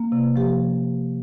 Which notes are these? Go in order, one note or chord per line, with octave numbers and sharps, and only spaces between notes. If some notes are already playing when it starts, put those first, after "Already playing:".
Already playing: A#3
C3
F3 G4